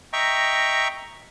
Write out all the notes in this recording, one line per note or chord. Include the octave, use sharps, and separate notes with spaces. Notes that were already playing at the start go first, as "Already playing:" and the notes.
D#5 E5 G5 A#5 C#6